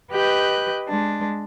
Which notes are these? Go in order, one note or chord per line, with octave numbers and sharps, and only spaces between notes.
G4 B4 D#5 F#6 G6
G#3 D4